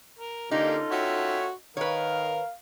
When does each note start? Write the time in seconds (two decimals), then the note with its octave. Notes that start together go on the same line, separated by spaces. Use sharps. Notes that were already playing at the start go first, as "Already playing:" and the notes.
0.19 A#4
0.51 D3 A#3 C#4 D#4 F4 G4 A4
0.91 F#4 C#5 E5 G5
1.77 D#3 A#4 B4 C#5 F5